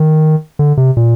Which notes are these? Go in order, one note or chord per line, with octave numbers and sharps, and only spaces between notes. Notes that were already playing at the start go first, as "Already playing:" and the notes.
Already playing: D#3
D3
C3
A#2